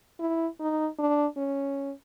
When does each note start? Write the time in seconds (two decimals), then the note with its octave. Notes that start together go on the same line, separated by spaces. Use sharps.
0.20 E4
0.60 D#4
0.99 D4
1.37 C#4